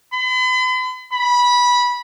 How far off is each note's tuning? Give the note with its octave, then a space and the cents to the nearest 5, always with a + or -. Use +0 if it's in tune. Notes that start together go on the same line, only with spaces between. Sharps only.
B5 +45
B5 -15